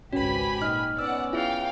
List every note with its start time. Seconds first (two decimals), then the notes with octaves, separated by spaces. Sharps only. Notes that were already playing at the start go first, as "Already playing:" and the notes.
0.13 G#1 C#2 C#4 F#4 G4 B4 G#5 B5
0.62 A#2 D#4 D#5 F6
0.99 B3 C#4 D5 F#5 E6
1.33 E4 F4 G#4 F5 G5 F6